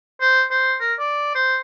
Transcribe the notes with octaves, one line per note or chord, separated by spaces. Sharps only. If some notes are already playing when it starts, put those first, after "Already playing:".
C5
C5
A#4
D5
C5